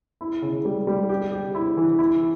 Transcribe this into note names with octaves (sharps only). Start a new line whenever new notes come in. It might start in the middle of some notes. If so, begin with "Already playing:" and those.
E4
C#3
G3
G3
G4
G4
E4
E3
E4